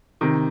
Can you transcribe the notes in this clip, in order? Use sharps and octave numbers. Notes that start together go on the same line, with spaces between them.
C3 D#3